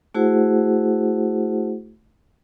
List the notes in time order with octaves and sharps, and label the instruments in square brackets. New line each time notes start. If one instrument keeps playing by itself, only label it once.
[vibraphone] A3 E4 F#4 G#4 C5 F#5